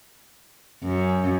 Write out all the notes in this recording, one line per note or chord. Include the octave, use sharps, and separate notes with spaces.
F#2